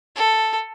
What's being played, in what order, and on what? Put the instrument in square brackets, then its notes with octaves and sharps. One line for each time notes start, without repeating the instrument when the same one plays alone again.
[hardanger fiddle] A4